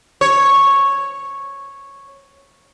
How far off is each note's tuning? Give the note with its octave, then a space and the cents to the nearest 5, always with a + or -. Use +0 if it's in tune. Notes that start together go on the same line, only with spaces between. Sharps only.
C#5 -5